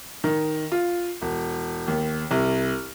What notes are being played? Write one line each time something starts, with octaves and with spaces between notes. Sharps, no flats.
D#3
F4
E1
D#2
C2